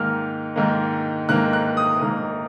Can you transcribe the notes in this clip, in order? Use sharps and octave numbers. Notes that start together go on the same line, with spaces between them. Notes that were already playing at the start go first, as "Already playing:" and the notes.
Already playing: G#2 D#3 A#3 F6
G#2 D#3 A#3
G#2 D#3 A#3 F#6
F#6
D#6
G#2 D#3 A#3